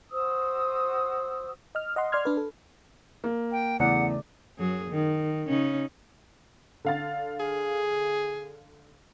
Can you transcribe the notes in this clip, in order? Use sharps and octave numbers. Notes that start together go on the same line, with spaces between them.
F#4 C5 D#6 E6
D#5 F6
D#5 F#5 C6
D5 C6 F6 G#6
D4 B4
A4
A#3
G5
E2 C#3 A3 D5 F#5
F#2 F#3 G#4
D#3
C#3 C#4 D#4
D3 F5 A6
G#4